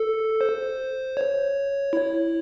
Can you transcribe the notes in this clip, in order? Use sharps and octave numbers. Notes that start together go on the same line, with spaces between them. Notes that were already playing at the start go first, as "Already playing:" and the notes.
Already playing: A4
C5
C#5
E4